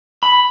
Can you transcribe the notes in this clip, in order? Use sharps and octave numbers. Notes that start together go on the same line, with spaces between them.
B5